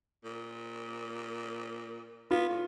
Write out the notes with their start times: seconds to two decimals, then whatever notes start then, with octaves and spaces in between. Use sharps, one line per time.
0.24 A#2
2.31 B3 F4
2.49 A2